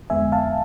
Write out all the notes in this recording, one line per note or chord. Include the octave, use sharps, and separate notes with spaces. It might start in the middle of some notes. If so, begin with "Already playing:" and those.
F2 D3 G#3 B3 E5 G#5
F5 A5